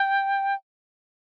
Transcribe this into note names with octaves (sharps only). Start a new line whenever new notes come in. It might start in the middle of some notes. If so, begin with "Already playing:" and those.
Already playing: G5